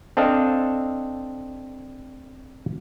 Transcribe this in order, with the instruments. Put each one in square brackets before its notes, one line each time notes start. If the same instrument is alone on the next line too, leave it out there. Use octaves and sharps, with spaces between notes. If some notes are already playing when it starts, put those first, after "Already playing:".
[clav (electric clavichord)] C4 D4 A4 D#5 F5